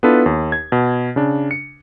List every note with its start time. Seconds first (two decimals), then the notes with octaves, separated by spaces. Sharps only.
0.03 B3 D4 E4 F4 A4 B4
0.26 D#2
0.52 G#6
0.72 B2
1.16 C#3 D4
1.51 C#7